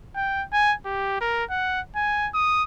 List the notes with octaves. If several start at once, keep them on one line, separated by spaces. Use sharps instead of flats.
G5
G#5
G4
A#4
F#5
G#5
D#6